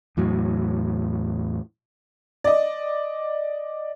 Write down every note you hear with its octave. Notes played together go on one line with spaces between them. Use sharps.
E2 A2 F#3
D5 D#5